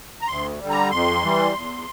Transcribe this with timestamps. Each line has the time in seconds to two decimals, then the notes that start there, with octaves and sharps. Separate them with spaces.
0.21 A#5
0.28 D2 C6
0.59 D3 G3
0.70 A#5
0.91 F2 C6
1.22 E3 G3
1.54 E2